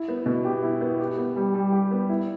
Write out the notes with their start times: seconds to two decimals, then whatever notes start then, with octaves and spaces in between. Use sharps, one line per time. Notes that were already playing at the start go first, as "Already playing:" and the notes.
Already playing: E4
0.08 B3
0.26 B2
0.44 G4
0.62 E4
0.81 B3
0.99 G4
1.18 B3
1.36 G3
1.54 G3
1.72 G4
1.91 B3
2.09 E4